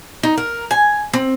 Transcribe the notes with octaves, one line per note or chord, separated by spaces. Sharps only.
D#4
A#4
G#5
C4